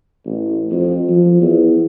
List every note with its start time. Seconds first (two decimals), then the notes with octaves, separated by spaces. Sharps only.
0.26 A1
0.71 F2
1.09 F3
1.41 E2